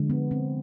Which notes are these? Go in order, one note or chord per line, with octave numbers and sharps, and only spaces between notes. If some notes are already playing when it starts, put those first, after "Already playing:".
Already playing: D3 F3 G#3
B3
C4